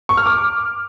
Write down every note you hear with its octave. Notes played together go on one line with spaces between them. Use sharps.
C#6
F6
D6